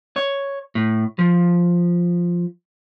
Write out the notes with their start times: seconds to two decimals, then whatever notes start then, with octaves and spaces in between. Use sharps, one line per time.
0.16 C#5
0.75 A2
1.19 F3